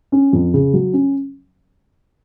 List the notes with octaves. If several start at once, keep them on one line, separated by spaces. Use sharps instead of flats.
C#4
F2
C#3
F#3
C#4